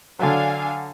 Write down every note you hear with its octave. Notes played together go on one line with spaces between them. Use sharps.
D3 F#3 D4 F5 G#5